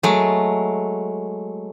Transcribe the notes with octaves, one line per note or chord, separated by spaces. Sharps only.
F#3 G#3 A3